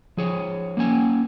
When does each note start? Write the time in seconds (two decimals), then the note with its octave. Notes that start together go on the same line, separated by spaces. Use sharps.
0.17 F3 G#4 C#5
0.77 A#3 C#4 D5 G#5